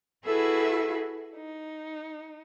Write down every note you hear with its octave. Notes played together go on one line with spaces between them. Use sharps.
E4 F#4 G#4 A4 B4 E5
D#4